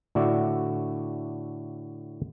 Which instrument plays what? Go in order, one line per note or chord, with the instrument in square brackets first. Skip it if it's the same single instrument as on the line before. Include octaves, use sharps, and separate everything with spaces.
[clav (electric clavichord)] A2 D3 F#4 D5 E5